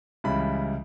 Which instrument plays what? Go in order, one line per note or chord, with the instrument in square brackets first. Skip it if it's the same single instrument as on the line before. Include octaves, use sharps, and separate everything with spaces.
[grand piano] C#2 C#3 E3 G3 B5